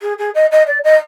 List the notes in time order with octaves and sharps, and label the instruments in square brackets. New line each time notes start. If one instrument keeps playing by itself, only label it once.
[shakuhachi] G#4
G#4
D#5
D#5
D5
D#5